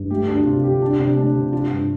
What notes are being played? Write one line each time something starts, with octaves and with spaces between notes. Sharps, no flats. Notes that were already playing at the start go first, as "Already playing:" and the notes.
Already playing: G2
A3 G4
D2 D4
C3 F4
D2 G4
D4 F4
C3 D4
A3 D4
C3 F4
D4 F4
G2 D4